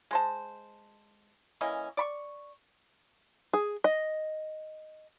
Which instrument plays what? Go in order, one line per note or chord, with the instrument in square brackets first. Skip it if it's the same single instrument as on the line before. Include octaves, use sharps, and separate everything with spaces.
[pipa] G#3 C5 A5
E3 A#3 C#4 D#5
D5 B5 C#6
[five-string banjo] G#4
D#5